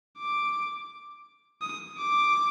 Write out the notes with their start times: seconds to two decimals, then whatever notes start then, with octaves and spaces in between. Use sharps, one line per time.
0.18 D6
1.62 D#6
1.98 D6